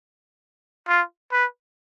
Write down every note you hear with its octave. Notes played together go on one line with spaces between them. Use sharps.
F4
B4